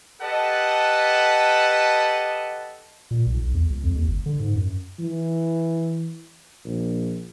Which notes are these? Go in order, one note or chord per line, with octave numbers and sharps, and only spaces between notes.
G4 A4 B4 D#5 F#5 A5
A#2
B1
B1
E2
C#2
F2
D#2
G1
D3
G#2
F#2
E3
A#1